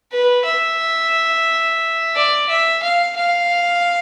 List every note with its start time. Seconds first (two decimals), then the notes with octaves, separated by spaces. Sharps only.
0.12 B4
0.45 E5
2.15 D5
2.49 E5
2.82 F5
3.16 F5